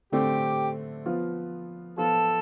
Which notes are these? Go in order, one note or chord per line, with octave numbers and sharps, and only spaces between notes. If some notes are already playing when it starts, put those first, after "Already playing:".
D3 A3 C4 G4
F3 B3 F4
F3 B3 F4 A4